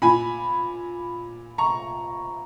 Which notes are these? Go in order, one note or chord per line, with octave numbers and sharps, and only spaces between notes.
A#2 G#5 B5
A#5 C#6